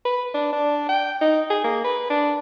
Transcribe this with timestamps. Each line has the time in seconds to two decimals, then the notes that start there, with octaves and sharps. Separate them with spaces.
0.05 B4
0.34 D4
0.53 D4
0.89 G5
1.21 D#4
1.50 G#4
1.64 A#3
1.84 B4
2.10 D4